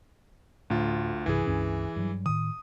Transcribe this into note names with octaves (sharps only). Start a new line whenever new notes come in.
D2 A2 F4
B1 G2 C3 E3 G#4
C#2 G2 C#4
G2 F#3
A2 D#3 D#6